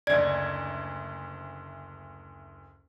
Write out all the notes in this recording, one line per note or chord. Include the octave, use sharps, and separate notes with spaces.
F#1 D2 D5 G#6